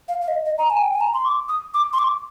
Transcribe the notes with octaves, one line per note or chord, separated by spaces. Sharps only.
F5
F5
D#5
D#5
A#5
G#5
G5
G#5
A#5
C6
D6
D#6
D6
C6
D6